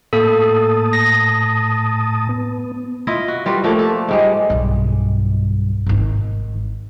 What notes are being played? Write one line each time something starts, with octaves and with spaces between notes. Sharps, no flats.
A2 A#3 A4 A5 D#6
A#6
B3
E4 F4 D#5
F#4
G3 F4 F#4 B4
F3 G3 A3 A#3
A4
G#2 G3 G#3
B1 G2
G#1 D#3